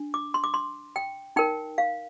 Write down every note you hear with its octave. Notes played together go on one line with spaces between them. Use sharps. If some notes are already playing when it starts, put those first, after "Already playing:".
Already playing: D4
D6
C6
D6
C6
G5
D#4 A#4 G5
F5